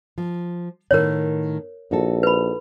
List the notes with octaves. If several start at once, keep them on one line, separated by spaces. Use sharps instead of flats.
F3
A2 D#3 B3 A#4 C#5
A#1 D#4 F#4 A4
B4 B5